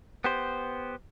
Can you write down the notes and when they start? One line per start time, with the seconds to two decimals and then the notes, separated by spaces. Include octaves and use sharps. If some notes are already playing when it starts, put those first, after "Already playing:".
0.24 B3 G4 C5